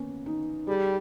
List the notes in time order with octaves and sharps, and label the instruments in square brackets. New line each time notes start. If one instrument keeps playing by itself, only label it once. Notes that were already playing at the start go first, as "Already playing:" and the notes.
Already playing: [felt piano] A#3 B3 C#4
D#4
[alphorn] G3 [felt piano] G#4